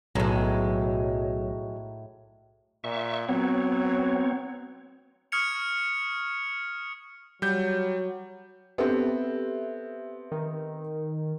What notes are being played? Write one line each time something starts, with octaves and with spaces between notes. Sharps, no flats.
B1 A2 F#3 G#3
A#2 E5 C#6
F#3 B3 C4 C#5
C#6 D#6 F6 G#6 C#7 F7
F#3 G3 G6
B3 C4 G4 A4 E5
D#3